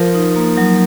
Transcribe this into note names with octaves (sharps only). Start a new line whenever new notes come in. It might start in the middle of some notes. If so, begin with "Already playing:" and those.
Already playing: F3 A#4
D#4
A#3
F#3